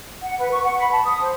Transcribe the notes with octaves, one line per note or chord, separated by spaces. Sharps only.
F#5
B4
C#6
F#5
B5
A5
D#6
C5